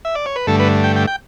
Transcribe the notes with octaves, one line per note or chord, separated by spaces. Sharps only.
E5
D5
C#5
B4
G2 D3 A3 A4
B4
G5
G5
G5